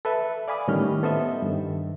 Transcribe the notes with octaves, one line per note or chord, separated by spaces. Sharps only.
A4 B4 E5
D5 F5 G#5 B5 D6 D#6
A2 D#3 G3 C#4 D#5 F6
B3 A4 C5 D#5 E5
G2 D#3